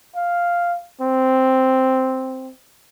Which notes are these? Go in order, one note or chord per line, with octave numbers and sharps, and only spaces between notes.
F5
C4